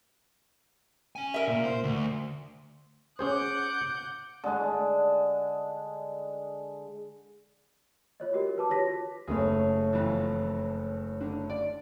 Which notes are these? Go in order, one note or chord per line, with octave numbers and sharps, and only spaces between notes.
C#4 G#5
A#4 E5
A#2
C5
D2
C#4 G#4 C5 F#5 D6 G6
D3 G#3 D4
F4 C#5 D#5
F#4 G4 A#4
F#4 B4 A5 D6
F4 G4 C#5 A#6 B6
F#1 A3 G#4 C#5
F2 E3
D3
D5